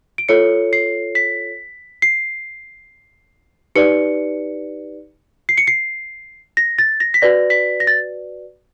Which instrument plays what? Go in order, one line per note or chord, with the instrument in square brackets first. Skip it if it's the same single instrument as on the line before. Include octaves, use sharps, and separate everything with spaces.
[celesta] D7
F4 A4 C#5 C#7
C7
B6
C7
D#4 G4 B4 D5 C#7
C7
C#7
C7
A#6
A6
A#6
B6
F#4 B4 D5 A#6
B6
A#6
A6